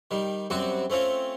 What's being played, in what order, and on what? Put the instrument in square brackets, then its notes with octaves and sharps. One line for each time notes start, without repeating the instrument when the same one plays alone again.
[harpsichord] D#3 G3
F#2 G3 C4 F#4
A3 C4 C#4 F4